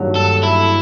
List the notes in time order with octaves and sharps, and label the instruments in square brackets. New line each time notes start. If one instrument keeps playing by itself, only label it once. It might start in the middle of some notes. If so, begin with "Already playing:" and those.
Already playing: [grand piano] G2 D#3 F#3 A#3
[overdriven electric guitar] A4
E4